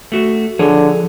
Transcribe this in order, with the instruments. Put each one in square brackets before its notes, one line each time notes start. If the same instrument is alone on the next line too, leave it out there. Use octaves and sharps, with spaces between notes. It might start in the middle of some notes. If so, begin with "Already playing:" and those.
[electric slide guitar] A3 F#4
[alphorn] D3 [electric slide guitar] F3 G#4 C#5